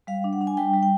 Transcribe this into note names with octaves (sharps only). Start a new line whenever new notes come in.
G3 F5
D4
F#5
D4
G#5
G3 G5
G3
G5